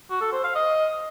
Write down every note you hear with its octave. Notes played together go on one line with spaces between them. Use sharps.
F#4
A4
C5
F5
D#5